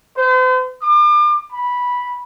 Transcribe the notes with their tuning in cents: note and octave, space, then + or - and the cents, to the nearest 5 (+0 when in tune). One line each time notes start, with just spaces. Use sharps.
C5 -40
D6 +40
B5 -10